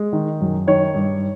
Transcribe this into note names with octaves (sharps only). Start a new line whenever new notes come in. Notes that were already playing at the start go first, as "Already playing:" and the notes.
Already playing: G#3
D#3
F#2
D#3 C#5
G2